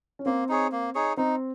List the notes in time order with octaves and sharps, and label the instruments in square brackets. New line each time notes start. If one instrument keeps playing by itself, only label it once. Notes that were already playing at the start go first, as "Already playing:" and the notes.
[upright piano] C#4
[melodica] A#3 [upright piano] C4
[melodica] D#4 G#4 C#5
A#3
D#4 G#4 C#5
[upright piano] C4 [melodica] D#4